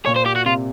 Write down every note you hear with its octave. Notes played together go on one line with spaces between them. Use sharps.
A#2 C#5
C5
G4
F#4
C3 F4